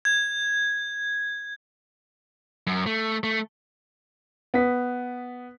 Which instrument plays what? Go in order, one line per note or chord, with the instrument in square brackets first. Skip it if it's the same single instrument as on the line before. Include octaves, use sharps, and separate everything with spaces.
[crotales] G#6
[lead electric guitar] F#2
A3
A3
[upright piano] B3 B6